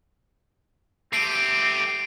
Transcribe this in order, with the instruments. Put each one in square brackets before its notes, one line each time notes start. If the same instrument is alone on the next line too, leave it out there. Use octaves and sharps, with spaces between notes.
[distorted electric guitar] A3 G4 [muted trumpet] C4 [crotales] C7 D7 D#7